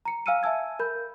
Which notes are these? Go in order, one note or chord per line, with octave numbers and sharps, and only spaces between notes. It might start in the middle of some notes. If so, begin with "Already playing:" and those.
A#5 C#7
F5 G#5 E6 F6 C#7 D#7
E5 G#5 A5 E6 G#6
A#4 B5 G6